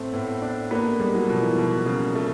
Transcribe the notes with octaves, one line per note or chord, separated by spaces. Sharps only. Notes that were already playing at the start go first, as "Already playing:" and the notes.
Already playing: A2 A3 C4
A2 B3
D4
A#3 B3
A3
G3 G#3
F#3
B2 F3
E3
B2 F3
C#3
A3